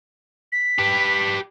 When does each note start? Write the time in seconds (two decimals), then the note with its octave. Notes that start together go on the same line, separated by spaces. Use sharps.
0.52 B6
0.78 G4 B4